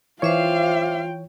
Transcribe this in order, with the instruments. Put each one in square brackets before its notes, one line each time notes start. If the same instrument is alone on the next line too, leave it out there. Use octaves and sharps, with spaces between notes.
[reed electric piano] E3 C#5 [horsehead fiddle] F4 G5 [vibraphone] C5 E5 D6 [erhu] F5